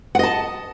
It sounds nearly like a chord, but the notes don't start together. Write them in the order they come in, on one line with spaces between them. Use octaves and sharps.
F#5 D#5 A5